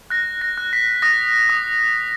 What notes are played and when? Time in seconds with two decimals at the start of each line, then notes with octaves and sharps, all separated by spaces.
0.10 F#6 A#6
0.42 A#6
0.58 F#6
0.73 B6
1.02 D#6 A#6
1.49 D#6